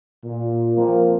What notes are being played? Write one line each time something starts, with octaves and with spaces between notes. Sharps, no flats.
A#2
F3 A#3 C4 A#4